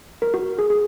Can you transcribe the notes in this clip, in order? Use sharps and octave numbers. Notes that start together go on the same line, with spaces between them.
A#4
F#4
G#4
G#4